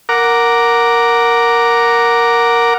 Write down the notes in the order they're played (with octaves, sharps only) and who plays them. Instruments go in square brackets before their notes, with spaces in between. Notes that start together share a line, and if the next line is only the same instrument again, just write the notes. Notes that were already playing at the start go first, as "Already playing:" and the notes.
[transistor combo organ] A#4 F#5 A#5 D6